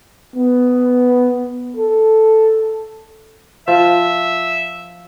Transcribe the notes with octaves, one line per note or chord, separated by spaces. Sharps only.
B3
A4
F3 E5